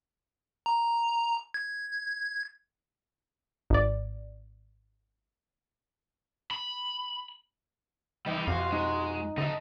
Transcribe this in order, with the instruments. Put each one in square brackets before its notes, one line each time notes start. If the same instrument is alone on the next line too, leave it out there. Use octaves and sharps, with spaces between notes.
[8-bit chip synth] A#5
G#6
[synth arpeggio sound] G#1 D5
[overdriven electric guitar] B5
[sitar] D#2 E3 D#4 [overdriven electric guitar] G3 E4
[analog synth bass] F2 [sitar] B2 F4 F#4 [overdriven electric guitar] F5
[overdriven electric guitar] G#3 [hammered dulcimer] D#4
[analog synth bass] D3 [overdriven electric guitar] D#4 A4 [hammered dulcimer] D#5 E5 A5